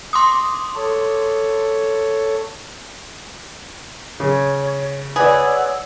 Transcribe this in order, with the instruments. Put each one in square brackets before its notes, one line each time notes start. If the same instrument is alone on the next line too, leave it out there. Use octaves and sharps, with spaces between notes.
[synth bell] C6 D6 D#6
[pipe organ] A4 C#5
[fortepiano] C#3 [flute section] C#5
[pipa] G#4 [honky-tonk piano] B4 D5 [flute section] C#5 F#5 E6